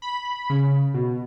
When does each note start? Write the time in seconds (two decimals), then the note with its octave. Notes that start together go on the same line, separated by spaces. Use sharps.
0.02 B5
0.50 C#3
0.94 B2